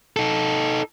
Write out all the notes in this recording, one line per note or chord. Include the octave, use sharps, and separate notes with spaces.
D#4 A4